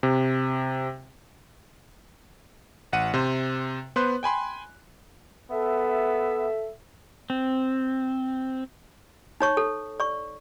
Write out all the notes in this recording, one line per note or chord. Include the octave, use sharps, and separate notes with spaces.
C3
A1 F#5 D#7
C3 C5
B3 B4 C5 C6 F#6
G5 G#5 B5 C6
B3 A4 E5
C4
D#4 C#5 C#6
A4
D5 C#6